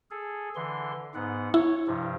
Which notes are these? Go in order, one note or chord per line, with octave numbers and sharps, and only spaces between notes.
G#4 A4
D3 E3 C6
G#2 B3 F#5
E4 C#5
G2 C3 F3